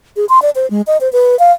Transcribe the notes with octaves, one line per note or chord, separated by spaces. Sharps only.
G#4
C6
D5
C5
G#3
D#5
C5
B4
F5